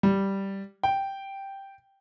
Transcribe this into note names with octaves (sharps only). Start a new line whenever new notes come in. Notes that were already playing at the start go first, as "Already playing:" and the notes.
G3
G5